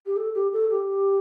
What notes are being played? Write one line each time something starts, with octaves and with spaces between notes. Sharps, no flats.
G4
A4
G4
A4
G4